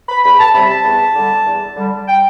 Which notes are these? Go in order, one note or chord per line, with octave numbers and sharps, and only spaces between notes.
B5
E2 B5
A5
C3 G3 B5
A5
E2
D3 G3
E2
D3 G3
G5